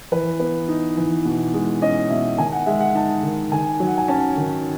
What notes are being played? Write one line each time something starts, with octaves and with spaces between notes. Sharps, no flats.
E3 B4
B3
D#4
E3
B2
G#3
C#4 D#5
B2 E5
D#3 G#5
F#5
G#3 E5
F#5
D#4 A5
D#3
D#3 G#5
F#3
F#5
G#5
C#4 A5
D#3